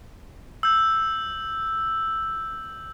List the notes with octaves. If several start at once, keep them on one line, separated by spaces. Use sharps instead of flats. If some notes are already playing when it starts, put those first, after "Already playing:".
E6 G6